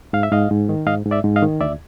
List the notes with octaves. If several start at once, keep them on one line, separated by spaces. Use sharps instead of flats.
G#2 F5
E5
G#2 D#5 F5
G#2
D#3
G#2 D#5 F5
G#2
D5 E5
G#2
D#5 F5
D#3
D2 D5 E5